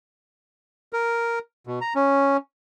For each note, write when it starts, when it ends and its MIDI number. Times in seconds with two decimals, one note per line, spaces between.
0.93 1.39 70
1.67 1.79 47
1.81 1.93 82
1.95 2.37 61